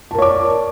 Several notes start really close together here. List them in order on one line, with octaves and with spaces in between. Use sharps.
A5 A#4 C#5 D6 D5